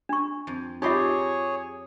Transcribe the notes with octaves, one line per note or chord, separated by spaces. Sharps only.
D4 C#6
F2
D#4 F4 G4 G#4 C#5 D5 E5 C6